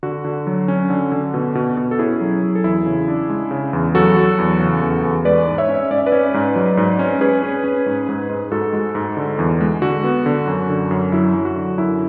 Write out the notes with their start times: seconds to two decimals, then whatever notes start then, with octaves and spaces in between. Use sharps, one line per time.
0.03 D3 F#4
0.25 D3
0.47 F#3
0.68 C#4
0.90 D3
1.12 D3
1.34 B2
1.55 B2
1.77 B2
1.91 A4
1.99 C#4 E4 G#4
2.21 F#3
2.43 F#3
2.55 A4
2.64 E2 E4 G#4
2.86 C#3
3.08 D4
3.29 G#3
3.51 C#3
3.73 E2
3.95 F#3 F#4 A4
4.17 F#3
4.38 E2
4.60 C#3
4.81 E2
5.04 E2
5.25 G#3 B4 D5
5.47 G#2
5.58 C#5 E5
5.69 C#4
5.90 G#2 D5
5.98 E5
6.06 B4 D5
6.12 C#4
6.34 G#2
6.56 F#3
6.77 G#2
6.99 C#4
7.21 C#4 G#4 B4
7.43 C#4
7.64 C#4
7.86 G#2
8.09 G#2
8.29 G#2
8.51 G#2 F#4 A4
8.73 G#3
8.95 G#2
9.17 D3
9.39 E2
9.61 G#3
9.82 D3 F#4
10.04 B3
10.26 D3
10.47 F#2
10.69 D3
10.91 F#2
11.12 F#3 E4
11.35 F#3
11.45 F#4
11.56 D3
11.78 F#2 E4